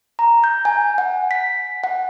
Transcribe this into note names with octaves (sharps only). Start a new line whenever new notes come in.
A#5
G6
G#5
F#5
B6
F#5